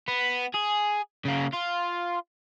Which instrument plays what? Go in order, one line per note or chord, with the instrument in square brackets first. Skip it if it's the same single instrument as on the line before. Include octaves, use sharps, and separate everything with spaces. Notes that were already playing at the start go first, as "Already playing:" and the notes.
[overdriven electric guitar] B3
G#4
C#3 A#3
F4